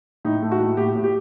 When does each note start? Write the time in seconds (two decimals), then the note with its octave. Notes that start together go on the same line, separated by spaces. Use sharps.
0.25 A2 D#4
0.42 A3
0.52 F#4
0.60 A2
0.77 A2 G4
0.95 A2
1.04 G4